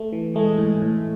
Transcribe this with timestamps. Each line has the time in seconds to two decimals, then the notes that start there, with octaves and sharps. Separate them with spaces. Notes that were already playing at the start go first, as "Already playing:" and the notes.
Already playing: A3
0.13 E3
0.36 G#3 A3
0.58 A2
0.81 A2 A3